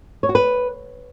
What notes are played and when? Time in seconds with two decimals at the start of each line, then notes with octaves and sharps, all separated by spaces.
0.23 C#5
0.29 F#4
0.35 B4